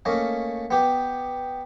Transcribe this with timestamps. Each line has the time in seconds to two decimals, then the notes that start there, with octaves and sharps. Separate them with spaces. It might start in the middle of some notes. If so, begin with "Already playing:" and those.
0.05 A3 A#3 C#4 D#5
0.71 B3 G4